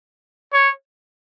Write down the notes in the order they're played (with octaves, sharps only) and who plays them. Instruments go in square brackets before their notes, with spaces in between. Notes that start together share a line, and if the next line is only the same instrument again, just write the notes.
[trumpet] C#5